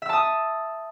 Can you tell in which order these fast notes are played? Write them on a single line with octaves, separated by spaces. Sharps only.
E5 E6 A5 D#6